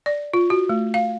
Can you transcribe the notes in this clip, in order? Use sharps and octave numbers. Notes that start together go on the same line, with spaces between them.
D5
F4
F#4
A3
F5